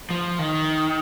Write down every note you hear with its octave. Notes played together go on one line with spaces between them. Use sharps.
F3
D#3